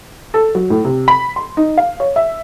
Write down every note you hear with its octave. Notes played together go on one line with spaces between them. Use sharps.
A4
F#3
A2
C3
B5
C6
D#4
F5
C#5
E5